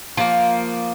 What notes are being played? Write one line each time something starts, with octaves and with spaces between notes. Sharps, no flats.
F3 A#3